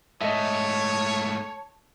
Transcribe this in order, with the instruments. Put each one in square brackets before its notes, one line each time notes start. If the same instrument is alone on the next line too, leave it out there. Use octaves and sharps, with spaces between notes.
[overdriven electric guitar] G#2 A3 [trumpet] C#5 [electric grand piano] D#5 E5 [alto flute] A5